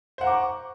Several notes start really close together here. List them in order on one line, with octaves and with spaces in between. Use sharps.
C5 F#5 A#5 D6 C#6